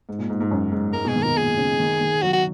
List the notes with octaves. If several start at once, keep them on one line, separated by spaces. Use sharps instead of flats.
G#2
A#2
G#2
G#2
F#2
G#2
G#2 A#4
B2 G#4
D#3
B2 A#4
A#2 G#4
C#3
D#3
D#3
F#3 F#4
F#4